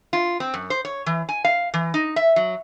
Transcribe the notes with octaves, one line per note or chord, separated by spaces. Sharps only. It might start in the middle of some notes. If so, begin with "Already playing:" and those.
F4
C4
F#2
C5
C#5
E3
G#5
F5
E3
D#4
E5
F#3